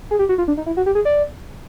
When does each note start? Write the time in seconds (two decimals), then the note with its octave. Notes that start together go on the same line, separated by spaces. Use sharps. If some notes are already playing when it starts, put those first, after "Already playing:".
0.11 G#4
0.19 G4
0.29 F#4
0.38 F4
0.48 D4
0.57 D#4
0.66 E4
0.77 F#4
0.86 G4
0.95 G#4
1.05 D5